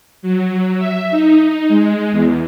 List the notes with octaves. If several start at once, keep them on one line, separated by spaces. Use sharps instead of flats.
F#3
E5
D#4
G#3
E2